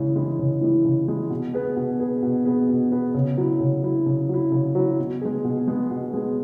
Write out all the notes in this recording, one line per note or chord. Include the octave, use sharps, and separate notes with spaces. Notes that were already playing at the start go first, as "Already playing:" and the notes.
Already playing: C#3 E3 G#3 E4
E3 G#3 E4
C#3
E3 G#3 E4
C#3
E3 G#3 E4
B2
B3 G#4 B4
B2
B3 G#4 B4
B2
B3 G#4 B4
B2
B3 G#4 B4
C#3
F#3 E4
C#3
F#3 E4
C#3
F#3 E4
C#3
F#3 E4
B2
G#3 B3 G#4
B2
G#3 B3 G#4
B2
G#3 B3 G#4